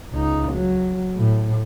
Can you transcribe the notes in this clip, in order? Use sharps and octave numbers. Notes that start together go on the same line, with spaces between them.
C#2 D#4
F#3
A2